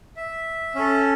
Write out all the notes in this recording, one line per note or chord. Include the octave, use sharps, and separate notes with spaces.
E5
C#4 A4